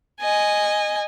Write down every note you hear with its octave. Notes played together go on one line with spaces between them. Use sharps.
D#5 G#5